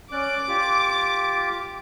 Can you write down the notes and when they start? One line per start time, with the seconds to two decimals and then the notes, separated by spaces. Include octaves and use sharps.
0.12 C#4 D5 D6 F#6
0.48 F4 G4